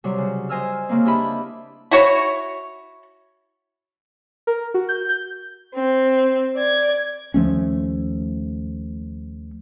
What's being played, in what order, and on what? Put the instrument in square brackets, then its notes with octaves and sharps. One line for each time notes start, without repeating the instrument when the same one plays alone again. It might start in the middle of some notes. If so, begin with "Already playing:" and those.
[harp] C3 F#3 G3
C#3
C5 D#5 G#5 E6 F6
C#3 A#3 C4
D4 E4 G4 D#5 E5 B5
[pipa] E4 F#4 C#5
[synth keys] A#4
F#4
G6
G6
[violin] C4
D5 G#6
[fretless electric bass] D#2 F3 A3 C#4